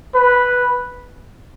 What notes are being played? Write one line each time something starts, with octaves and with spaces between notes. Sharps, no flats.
B4